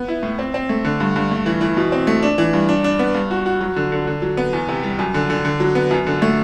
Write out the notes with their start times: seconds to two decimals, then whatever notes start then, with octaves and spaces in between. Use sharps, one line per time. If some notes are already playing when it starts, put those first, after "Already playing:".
Already playing: B3
0.08 E4
0.23 A2
0.39 C4
0.54 C4
0.69 A3
0.85 D3
1.00 G2
1.16 G2
1.31 A3
1.46 E3
1.61 E3
1.77 B2
1.92 C4
2.07 A3
2.23 D4
2.38 E3
2.53 G2
2.69 D4
2.84 D4
2.99 B3
3.14 G2
3.31 F#4
3.46 F#4
3.61 F#3
3.76 D3
3.92 D3
4.07 D3
4.22 F#3
4.37 B3
4.53 E2
4.69 C3
4.83 G3
4.99 F#2
5.14 D3
5.30 D3
5.45 D3
5.60 F#3
5.75 B3
5.91 F#2
6.07 D3
6.22 A3